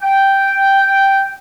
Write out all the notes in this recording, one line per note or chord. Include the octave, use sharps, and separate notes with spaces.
G5